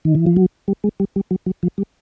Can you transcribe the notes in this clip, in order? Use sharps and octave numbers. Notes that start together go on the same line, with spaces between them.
D#3
E3
F3
F#3
G3
G#3
G3
G3
F#3
F#3
F3
G3